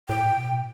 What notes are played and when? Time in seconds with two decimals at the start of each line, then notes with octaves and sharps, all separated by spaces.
0.09 A2 G5
0.37 B2